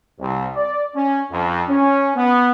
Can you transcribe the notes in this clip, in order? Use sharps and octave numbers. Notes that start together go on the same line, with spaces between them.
C2
D5
C#4
F2
C#4
B3